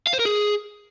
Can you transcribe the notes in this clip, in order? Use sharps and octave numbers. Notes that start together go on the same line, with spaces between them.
F5
C5
A#4
G#4